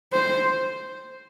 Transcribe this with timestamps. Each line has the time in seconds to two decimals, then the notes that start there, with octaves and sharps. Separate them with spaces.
0.13 C5